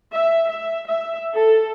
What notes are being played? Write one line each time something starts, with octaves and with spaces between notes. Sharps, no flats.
E5
E5
E5
A4